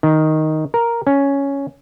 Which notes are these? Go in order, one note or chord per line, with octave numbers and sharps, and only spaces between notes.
D#3
A#4
C#4